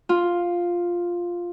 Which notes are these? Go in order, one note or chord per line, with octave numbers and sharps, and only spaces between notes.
F4